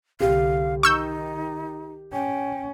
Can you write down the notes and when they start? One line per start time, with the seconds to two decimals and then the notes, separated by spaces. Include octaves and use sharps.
0.20 C2 D3 G4 F5
0.83 D#3 D#4 C#6 E6 G6
2.13 C#4 G5